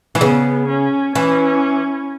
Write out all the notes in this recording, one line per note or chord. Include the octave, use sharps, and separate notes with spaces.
E3
C#3 B3
C#4
E3 C#4